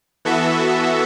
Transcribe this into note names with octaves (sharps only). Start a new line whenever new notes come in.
E3 B3 F#4 A4 E5